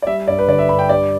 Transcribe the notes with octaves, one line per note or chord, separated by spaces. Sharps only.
D5
G3 E5
G2 D5
B4
D3 D5
E5
G2 B5
G5
G3 D5